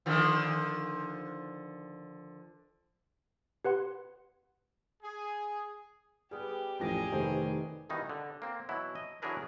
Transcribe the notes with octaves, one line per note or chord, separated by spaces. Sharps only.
D3 D#3 F3
G4 B4 F#5 C6
G#4
G3 B3 G4 G#4
A1 F2 G4 G#4 A#6
F1 D#3 E3 A3 C5
G2 B2 D#3 E3 D#4
D3
A#3 C4
B2 E3 F#3 E4
D#5
E3 F#3 D4 G#4 A#4 B4